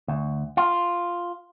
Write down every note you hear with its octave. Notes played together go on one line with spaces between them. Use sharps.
D2
F4